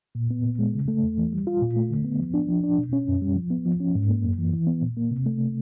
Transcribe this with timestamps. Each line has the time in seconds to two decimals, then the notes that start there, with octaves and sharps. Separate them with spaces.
0.15 A#2
0.30 B3
0.44 A#2
0.59 G#3
0.74 C#3
0.88 A3
1.02 E2
1.18 E3
1.32 G3
1.47 F4
1.61 A#2
1.76 A3
1.90 D3
2.05 B3
2.20 F3
2.34 D4
2.49 F3
2.63 D4
2.78 B2
2.93 C#4
3.08 F#2
3.22 G3
3.36 F3
3.50 B3
3.65 F3
3.80 C#4
3.95 G#2
4.09 A#3
4.24 F#2
4.38 E3
4.53 E3
4.67 B3
4.82 A#2
4.97 A#3
5.11 C3
5.26 A3